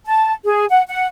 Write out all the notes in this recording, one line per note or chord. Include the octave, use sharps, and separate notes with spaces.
A5
G#4
F#5
F#5